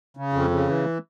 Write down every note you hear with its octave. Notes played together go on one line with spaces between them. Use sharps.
C#3
F2
C#3
E3